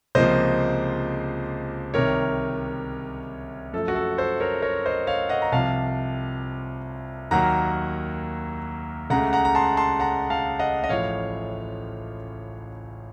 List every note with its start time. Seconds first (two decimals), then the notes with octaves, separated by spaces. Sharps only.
0.15 C#2 C3 F3 A#3 C5 D#5
1.94 C2 C3 D#3 A#4 C#5
3.73 F#2 F3 A3 A4
3.88 F#4
3.95 A4
4.18 A4 C5
4.40 A#4 C#5
4.62 A#4 C#5
4.85 C5 D#5
5.07 C#5 F5
5.29 D#5 F#5
5.42 A#5
5.52 C2 C3 F3 F5 A5
7.31 D#2 D#3 F#3 A#3 F#5 A#5
9.10 C#2 C#3 A3 F#5 A#5
9.33 F#5 A#5
9.45 A#5
9.55 A5 C6
9.77 A5 C6
10.00 F#5 A#5
10.30 F5 A5
10.59 D#5 F#5
10.84 D#5
10.89 A1 A2 F3 C#5 F5